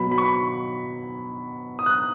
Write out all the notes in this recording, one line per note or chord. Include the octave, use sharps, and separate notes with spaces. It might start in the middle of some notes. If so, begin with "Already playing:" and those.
Already playing: B2 F#3 B5
B5
C#6
D#6
F#6